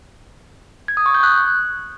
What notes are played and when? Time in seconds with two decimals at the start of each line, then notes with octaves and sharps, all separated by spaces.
0.88 G#6
0.97 D#6
1.06 C#6
1.15 G6
1.23 F#6